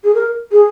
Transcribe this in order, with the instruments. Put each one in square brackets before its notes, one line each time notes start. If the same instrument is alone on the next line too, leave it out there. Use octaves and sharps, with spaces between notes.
[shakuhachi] G#4
A#4
G#4